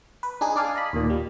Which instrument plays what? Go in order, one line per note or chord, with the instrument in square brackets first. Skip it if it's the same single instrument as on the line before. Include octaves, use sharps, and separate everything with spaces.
[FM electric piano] B4
D4 D#4 G#4
D4 D5 F5 G#5
D#5 B5
D#2 A#2
G3